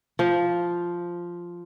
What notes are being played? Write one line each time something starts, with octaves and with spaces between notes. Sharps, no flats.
F3